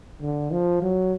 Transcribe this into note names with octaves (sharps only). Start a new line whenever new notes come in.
D3
F3
F#3